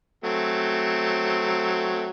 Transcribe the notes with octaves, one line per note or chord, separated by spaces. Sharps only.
F#3 A3 C4